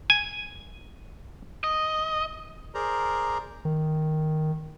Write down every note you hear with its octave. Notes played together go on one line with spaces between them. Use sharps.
G#5
D#5
G#4 A#4 C5 D5 A#5
D#3